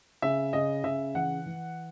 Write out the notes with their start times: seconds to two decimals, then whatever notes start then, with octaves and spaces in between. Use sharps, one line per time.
0.22 C#3 E5
0.53 C#3 D#5
0.84 C#3 E5
1.15 E3 F#5
1.46 E3